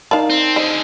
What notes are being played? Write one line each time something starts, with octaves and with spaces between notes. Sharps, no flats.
D#4 A#4 D5 F5 A5
C4
D3 G#4 C5 D#5